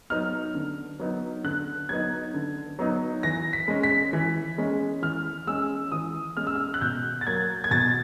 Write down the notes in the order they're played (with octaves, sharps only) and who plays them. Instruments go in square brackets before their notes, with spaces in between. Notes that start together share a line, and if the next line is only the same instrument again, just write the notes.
[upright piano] F#3 B3 D#4 F6
D3
F#3 B3 D#4
D3 F#6
F#3 B3 D#4 G#6
D3
F#3 B3 D#4
E3 A#6
B6
G#3 C#4
B6
E3
G#3 C#4
E3 F6
G#3 C#4 E6
E3 D#6
G#3 C#4 F6
E6
F6
F#6
B2 G6
A6
F#3 A#3 G#6
G#6
B2 A6